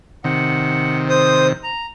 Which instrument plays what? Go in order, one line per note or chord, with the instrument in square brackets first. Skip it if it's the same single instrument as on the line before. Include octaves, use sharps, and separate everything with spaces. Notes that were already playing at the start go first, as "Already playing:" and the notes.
[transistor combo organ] C3 D#3 [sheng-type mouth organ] F#5
[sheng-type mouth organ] C5 D#6
A#5